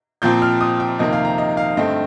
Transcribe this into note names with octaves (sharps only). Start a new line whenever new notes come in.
A#2 F3 C4 G6
F6
D#6
G5
F2 C3 D#3 A#3 D#5
F5
A#5
D#5
F5
G2 D3 A3 C4 D#5